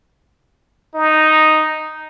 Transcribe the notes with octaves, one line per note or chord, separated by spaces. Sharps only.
D#4